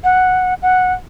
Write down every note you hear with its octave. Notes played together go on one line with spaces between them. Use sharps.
F#5
F#5